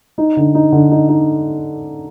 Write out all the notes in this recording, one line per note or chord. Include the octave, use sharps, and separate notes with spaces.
D#4
D3
D#4
D3
D#4
D#4